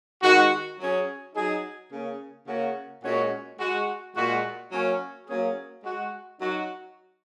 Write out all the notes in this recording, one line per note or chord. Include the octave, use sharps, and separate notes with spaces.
D#3 G#3 F#4
F#3 C#4 G#4
F#3 D#4 G#4
C#3 A#3 C#4 G#4
C#3 A#3 C#4 F#4
A#2 G#3 C#4 F#4
G#3 F#4
A#2 G#3 F#4
F#3 A#3 C#4
F#3 A#3 C#4 G#4
G#3 F#4
F#3 D#4 F#4